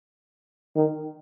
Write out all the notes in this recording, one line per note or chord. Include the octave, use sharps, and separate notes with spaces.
D#3